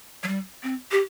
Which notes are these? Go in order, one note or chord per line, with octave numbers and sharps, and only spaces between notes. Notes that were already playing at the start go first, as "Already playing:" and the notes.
F#3
G3
C4
G4